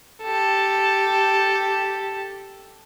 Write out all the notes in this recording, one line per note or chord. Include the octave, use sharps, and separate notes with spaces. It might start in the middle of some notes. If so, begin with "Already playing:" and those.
G4 A4